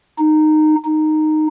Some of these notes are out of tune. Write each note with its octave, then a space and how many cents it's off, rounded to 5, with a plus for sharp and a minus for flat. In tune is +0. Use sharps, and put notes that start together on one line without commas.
D#4 -15
D#4 -10